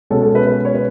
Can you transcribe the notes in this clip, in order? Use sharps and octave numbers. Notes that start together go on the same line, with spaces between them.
B2 G#3 C#4 A4
A4
B4
B4
C#5
B4